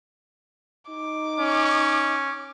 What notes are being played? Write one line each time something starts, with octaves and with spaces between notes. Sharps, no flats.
D#4 D6
C#4